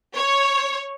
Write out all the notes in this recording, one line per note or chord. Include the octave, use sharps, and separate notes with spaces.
C#5